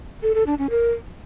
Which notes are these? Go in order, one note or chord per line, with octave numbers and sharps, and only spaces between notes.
A4
A4
D4
C#4
A#4